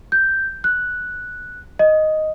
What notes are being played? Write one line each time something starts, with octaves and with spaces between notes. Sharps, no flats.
G6
F#6
D#5